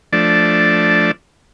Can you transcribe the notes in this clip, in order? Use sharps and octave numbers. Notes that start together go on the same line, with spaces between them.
F3 A3 D4 D5